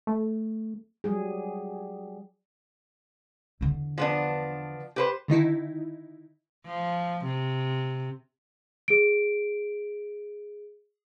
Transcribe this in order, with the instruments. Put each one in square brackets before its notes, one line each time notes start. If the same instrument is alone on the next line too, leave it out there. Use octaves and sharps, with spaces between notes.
[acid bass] A3
[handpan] F#3 G3 G#4
[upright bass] E2 D3
[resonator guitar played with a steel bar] F3 B3 D4
G4 B4 C5
[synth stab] D3 D#3 D#4 E4
[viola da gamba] F3
C3
[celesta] G#4 D7